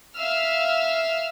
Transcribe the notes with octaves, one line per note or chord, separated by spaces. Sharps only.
E5 F5 E6 F6